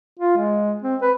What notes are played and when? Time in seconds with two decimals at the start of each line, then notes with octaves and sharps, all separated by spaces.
0.19 F4
0.37 G#3
0.82 C4
1.02 B4